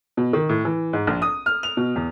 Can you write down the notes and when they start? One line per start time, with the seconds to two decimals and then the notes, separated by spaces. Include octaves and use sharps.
0.17 B2
0.33 D#3
0.49 A2
0.65 E3
0.93 G#2
1.07 A#1
1.22 D#6
1.46 F6
1.63 F7
1.77 B2
1.96 E2